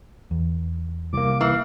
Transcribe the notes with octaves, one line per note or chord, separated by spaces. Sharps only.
E2
C2 A#3 D6
E3 F5